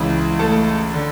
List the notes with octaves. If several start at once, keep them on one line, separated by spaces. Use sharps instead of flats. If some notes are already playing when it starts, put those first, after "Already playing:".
Already playing: C#2 C#3 E3
A3 A4
D3